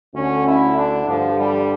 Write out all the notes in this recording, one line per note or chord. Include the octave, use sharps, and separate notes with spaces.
D2 D3 C#4
E4
D4
G2 D3 F3
G3